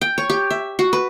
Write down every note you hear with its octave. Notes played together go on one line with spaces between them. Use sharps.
G5
C#5
G4
E5
F#4
B4